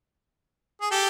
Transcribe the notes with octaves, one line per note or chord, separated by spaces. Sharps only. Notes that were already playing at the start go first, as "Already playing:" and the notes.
G#4
G4 A4